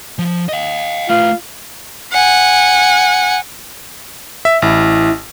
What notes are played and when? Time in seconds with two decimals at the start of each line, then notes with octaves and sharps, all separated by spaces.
0.19 F3
0.49 D#5 F5
1.09 A3 F4 B4
2.12 F#5 G#5
4.45 E5
4.62 A1 E4